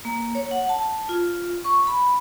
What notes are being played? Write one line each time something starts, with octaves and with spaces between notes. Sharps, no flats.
A#3
C#5
F#5
A5
F4
C#6
B5